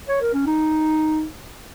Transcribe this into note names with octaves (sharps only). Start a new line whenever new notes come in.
C#5
A#4
C#4
D#4